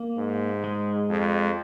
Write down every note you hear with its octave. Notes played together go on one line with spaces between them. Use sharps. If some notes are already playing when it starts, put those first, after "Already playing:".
Already playing: A#3
G#2
G#3
F2